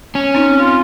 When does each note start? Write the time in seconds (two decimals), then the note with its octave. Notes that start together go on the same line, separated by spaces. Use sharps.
0.15 C#4
0.35 C4 D#4
0.58 F4